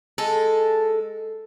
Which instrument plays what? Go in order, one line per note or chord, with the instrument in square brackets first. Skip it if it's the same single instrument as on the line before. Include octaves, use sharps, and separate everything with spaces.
[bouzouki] G#3 A4